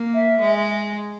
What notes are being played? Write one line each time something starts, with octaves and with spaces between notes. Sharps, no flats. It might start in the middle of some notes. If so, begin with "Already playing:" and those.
Already playing: A#3
E5
G#3